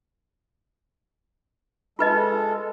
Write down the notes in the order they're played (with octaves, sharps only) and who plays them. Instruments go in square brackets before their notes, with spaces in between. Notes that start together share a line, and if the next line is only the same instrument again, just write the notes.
[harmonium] G#3 A4 [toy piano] F4 B4 D#5